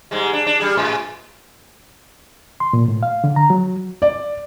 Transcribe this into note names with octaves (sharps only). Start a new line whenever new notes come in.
G#2 G3 G#3
D4
D4
G3 G#4
A2 G#3
C6
A#2
A2
F5
D3
A#5
F#3
D5